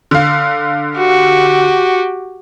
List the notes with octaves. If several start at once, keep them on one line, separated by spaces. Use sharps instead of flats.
D3 F5
F#4 G4